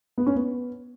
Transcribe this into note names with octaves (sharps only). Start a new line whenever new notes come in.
B3
C#4
B3